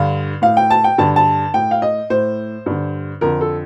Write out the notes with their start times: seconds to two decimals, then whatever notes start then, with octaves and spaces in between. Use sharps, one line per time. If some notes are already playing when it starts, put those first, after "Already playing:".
Already playing: G2 D3 F5
0.42 A2 F5
0.57 G5
0.70 A5
0.84 G5
0.98 G2 D3 A5
1.16 A5
1.54 A2 G5
1.71 F5
1.82 D#5
2.10 A2 C5
2.66 G2 D3
3.21 F2 D3 A#4
3.41 A4